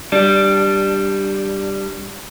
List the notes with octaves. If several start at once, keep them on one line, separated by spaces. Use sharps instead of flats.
G3 D4